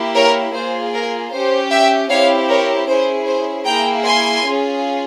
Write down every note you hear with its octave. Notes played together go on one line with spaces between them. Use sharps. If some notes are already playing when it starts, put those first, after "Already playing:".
Already playing: A#3 E4 G4
A#4 C#5
A#3 F4 G#4 C5
A#4
C#4 G4 C5
E5 G5
C4 E4 G4 C#5 F5
A#4 C#5
C#4 E4 G#4 C5
C5
A#3 E4 G#4 G5 A#5
G#5 C6
C#4 F4 G#4